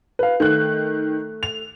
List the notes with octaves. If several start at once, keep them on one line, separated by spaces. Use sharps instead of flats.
B4 F5
D#3 A3 F#6
F7